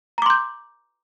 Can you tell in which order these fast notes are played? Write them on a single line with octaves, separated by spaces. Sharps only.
A#5 D6 C6 G6